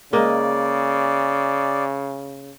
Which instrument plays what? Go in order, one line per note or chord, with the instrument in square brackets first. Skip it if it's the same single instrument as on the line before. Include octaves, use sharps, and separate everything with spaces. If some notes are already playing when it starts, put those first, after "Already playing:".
[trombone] C#3 [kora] G#3 A#3 D#5 [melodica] D5